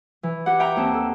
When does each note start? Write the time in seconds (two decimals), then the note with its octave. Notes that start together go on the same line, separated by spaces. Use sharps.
0.23 E3
0.46 G4 F#5
0.59 E5 G5 A#5
0.76 D#2 C4 A5
0.93 A4